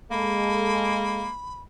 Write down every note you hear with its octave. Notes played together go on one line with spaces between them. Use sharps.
G#3 A#3 A4 B5